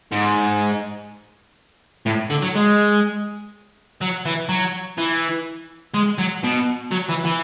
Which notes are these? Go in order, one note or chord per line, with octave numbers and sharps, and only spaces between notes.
G#2
A2
D3
F#3
G#3
F#3
E3
F#3
E3
G#3
F#3
B2
F#3
E3
E3